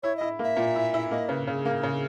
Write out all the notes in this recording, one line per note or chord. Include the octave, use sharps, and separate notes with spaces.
E4 C#5
E4 D#5
A#3 E5
A#2
E4
E4
A#3 D#5
C#3 B4
C#3 G#4
A#3
C#3